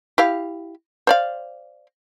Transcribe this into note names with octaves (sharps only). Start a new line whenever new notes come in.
E4 G4 F5
C5 D5 F5